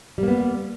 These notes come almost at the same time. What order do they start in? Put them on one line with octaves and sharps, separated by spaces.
G3 A#3 B3